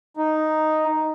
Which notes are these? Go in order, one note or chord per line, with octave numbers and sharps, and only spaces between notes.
D#4